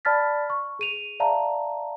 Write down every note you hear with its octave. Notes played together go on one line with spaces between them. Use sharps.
D5 A5 B5 F6 A6 B6
C#6
G#4 D#7 F7
D5 E5 F5 A5 A#5